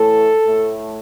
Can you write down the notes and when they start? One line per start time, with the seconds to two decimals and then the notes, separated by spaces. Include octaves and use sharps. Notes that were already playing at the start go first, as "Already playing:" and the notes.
Already playing: A2 E3 A3 A4
0.46 A2 A3